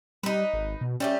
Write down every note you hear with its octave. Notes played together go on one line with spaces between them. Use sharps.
G3 D#4 B4
G#1
B2
G3 A3 C#4 G4